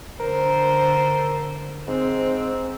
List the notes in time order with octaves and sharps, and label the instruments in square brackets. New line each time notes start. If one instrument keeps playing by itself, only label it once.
[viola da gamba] D3 C5 [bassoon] A#4
[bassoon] G#2 [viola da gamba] C4